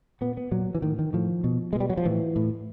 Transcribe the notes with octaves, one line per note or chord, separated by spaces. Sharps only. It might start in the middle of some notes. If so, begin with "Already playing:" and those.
A#2 B3
B3
A#2 F#3
E3
A2 D#3
D#3
A2 F3
B2
G#3
B2 G3
F#3
F3
A2 E3
A2